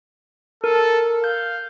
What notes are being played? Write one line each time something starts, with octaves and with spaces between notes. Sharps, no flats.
A4 A#4
F5 G6